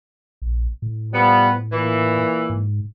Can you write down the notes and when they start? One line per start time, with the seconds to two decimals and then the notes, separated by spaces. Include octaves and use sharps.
0.42 A#1
0.82 A2
1.13 F3 G3 B3
1.72 A#2 E3
2.50 G#2